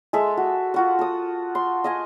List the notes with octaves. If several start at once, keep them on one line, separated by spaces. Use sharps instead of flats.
G#3 A4 E5
F#4
F4 F#4 F#5
A4 D#6
C6
D#5 F5 G#5